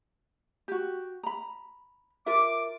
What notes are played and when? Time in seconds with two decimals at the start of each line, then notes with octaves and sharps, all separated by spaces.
0.68 F#4 G4
1.23 A#5 B5
2.26 F4 A#4 E5 D6